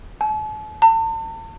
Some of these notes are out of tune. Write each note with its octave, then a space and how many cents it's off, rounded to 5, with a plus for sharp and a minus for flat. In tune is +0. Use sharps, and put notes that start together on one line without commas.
A5 -45
A5 +40